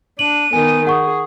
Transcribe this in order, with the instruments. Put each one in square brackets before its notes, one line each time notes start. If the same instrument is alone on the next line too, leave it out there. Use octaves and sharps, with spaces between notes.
[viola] D4 [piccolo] D#7 [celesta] F#7
[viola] D#3 B3 [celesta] G#5
[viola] G#4 [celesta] F#5 C#6